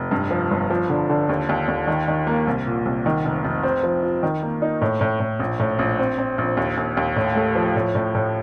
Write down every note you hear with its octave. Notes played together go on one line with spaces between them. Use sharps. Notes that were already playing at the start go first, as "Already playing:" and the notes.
Already playing: F1
G2
F3
G1
F3
D3
D3
D#2
D#2
D#2
D#3
D#3
A#3
C2
A#2
C2
D#3
F1
F1
C4
F3
F4
D#3
A#3
D#4
A2
A2
A2
A#1
A2
A#1
C4
C4
A#1
D#2
D#2
D#2
A2
A3
F3
A2
A2
A2